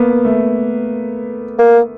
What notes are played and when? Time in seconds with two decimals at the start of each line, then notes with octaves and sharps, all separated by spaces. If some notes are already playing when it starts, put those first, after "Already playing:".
Already playing: A#3 B3
0.25 A3
1.59 A#3